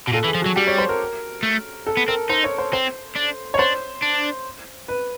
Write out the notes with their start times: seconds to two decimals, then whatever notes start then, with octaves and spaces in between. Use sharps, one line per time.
0.08 B2
0.13 A#2 A4
0.24 E3
0.27 G#4
0.35 F3
0.42 F#3 F#4
0.56 G3 G4
0.67 C#5
0.78 C5
0.89 A#4
1.43 A3
1.87 A4
1.97 B3
2.08 C4 A#4
2.29 D#4 C5
2.44 C#5
2.58 C5
2.73 C4 C5
3.16 D4
3.54 C#5
3.59 D4 C5
4.02 D4
4.88 B4